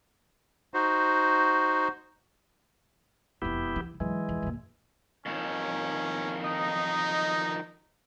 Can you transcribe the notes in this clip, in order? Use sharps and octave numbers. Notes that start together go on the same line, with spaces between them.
D#4 F#4 C5
E1 F2 B3 E4 G4
E3
G#2 E3 F#3 G#3
F2
F#2 A#2
F2 D#3 C#4
D#4 D#5